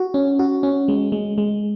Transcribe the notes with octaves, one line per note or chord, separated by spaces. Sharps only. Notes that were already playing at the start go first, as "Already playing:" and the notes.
Already playing: F#4
C#4
F#4
C#4
G#3
G#3
G#3